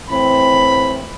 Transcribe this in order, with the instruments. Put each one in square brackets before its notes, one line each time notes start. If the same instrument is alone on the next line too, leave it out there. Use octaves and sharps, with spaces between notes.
[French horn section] A2 E3 C4 [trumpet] B5